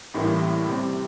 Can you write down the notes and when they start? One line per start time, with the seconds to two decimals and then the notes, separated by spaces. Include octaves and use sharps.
0.14 A1 A2 G3 A#3 E4
0.68 C3 G3 C4